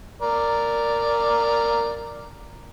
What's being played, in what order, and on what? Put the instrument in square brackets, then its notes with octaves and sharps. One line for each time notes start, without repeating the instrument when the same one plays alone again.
[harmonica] A#4 D5